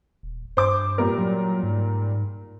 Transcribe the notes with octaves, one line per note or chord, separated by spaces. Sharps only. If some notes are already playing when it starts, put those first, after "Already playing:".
D#1
G2 C5 D6
A#2 G3 A#4
F#3
G#2